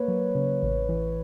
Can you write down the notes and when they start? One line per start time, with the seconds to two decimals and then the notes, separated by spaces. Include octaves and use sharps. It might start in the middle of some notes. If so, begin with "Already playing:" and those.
Already playing: A#3 B4 C#5
0.08 F#3
0.35 C#3
0.63 A1
0.89 E3